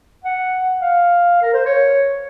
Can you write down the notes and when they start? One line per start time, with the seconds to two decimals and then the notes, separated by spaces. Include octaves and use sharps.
0.24 F#5
0.80 F5
1.42 A#4
1.53 C5
1.66 C#5